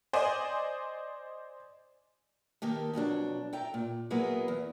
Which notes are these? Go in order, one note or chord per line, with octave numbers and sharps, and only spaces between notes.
C5 D5 D#5 G#5
D#3 A#3 G4 A4
F2 B2 F#3 D4
A4 E5 G5 A#5
A#2
F#3 A#3 B3 E4 G#4
E2